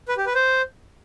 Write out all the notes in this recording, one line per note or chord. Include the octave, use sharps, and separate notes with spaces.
B4
G4
B4
C5